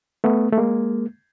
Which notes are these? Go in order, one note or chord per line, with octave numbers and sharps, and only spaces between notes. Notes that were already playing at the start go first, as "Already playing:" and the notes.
A3 B3
A3
G#3 A#3